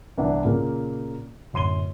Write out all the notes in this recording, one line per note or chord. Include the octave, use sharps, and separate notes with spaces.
C2 E3 B3 D4 F#5
A#2 C#3 A#3
D1 F#2 C6 D#7 G7